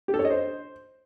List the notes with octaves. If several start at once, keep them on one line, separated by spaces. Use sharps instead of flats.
G4
A4
C#5
D#5
C5